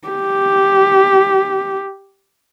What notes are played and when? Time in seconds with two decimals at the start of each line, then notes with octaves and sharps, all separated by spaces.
0.08 G4